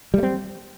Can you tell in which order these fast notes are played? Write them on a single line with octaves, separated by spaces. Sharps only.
G3 A3 C4